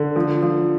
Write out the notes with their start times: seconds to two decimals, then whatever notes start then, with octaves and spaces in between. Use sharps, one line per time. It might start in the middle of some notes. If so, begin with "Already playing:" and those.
Already playing: D3
0.16 F3
0.42 F3